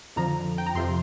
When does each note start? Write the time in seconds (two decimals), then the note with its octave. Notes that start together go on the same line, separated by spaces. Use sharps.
0.16 F2 D3 F3 A#5
0.58 G5
0.66 A#5
0.75 F2 C3 F3 C6